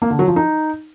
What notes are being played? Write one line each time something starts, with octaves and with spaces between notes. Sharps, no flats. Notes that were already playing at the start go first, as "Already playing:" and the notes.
A#3
D3
F#3
F3
D#4